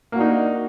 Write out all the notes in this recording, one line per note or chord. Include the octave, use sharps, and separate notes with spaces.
A#3 D4 D#4 F#4